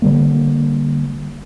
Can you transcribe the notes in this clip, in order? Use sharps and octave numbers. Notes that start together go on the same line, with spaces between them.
D3 G3 A#3